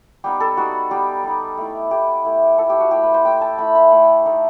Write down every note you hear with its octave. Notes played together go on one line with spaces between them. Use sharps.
G3 B3 D#4 G4
A4
G3 B3 D#4 F#4
G3 B3 D#4 G4
G3 B3 D#4
A3 E4
A3 E4 G4
A3 E4
A3 E4 A4
G4
F#4
A3 E4 G4
B4
C5
A3 E4 G5
A5
A3 E4 B5
B5
A3 E4
A3 D#4